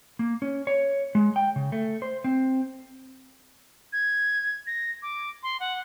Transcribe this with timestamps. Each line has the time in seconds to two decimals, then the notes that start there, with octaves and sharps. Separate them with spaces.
0.19 A#3
0.42 C#4
0.67 C#5
1.15 G#3
1.36 G5
1.56 C#3
1.72 A3
2.02 C5
2.24 C4
3.93 G#6
4.67 A#6
5.02 D6
5.43 C6
5.60 F#5